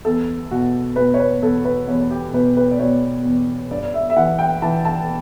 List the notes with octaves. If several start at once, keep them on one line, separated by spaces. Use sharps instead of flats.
E2 A4
B2 F#4
B2 B4
C#5
B4
E2 A4
B4
E2 C#5
G4
B2 B4
B4
D5
B2 C#5
E2
G2 D5
E5
E5
E3 F#5
G5
E3 A5
A5